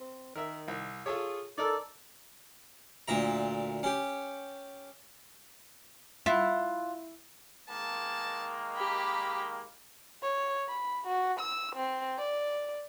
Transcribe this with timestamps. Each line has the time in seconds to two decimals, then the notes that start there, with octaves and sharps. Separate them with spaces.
0.01 C4
0.36 D#3 A#4 E5
0.68 C2
1.06 F4 G#4 A4 C#5
1.58 D#4 A4 A#4 D5
3.08 D2 A#2 E5 A#5
3.83 C#4 G4
6.26 E4 F4 F#5
7.69 D#3 G#3 A#3 A5
8.76 G4 B5
10.22 C#5
10.68 B5
11.07 F#4
11.40 E6
11.75 C4
12.18 D5